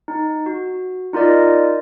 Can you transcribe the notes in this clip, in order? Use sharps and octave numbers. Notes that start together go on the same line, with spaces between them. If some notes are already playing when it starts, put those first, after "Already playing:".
D#4
F#4
D#4 F4 A#4 D5 D#5